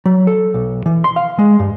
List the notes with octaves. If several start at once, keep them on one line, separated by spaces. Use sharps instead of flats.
F#3
A4
B1
E3
C6
F5
G#3
G2